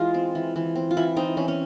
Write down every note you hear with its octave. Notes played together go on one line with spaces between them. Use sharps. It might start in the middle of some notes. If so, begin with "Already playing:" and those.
Already playing: E3 G#3 F4
C4
E3
E3
C4
F4
E3 E4
C4 D#4
E3 C#4
C#4